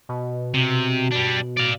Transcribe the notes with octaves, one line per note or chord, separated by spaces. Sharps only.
B2
C3
G3 D4
D5 F5